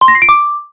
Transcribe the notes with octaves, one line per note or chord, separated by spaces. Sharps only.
C6
A#6
C7
D7
D6